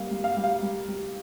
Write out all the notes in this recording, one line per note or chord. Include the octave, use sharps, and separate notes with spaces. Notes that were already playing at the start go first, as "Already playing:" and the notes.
Already playing: G3 A#3 F5
G3
F5
G3
F5
G3
G3